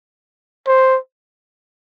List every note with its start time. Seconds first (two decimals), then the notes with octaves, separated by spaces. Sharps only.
0.67 C5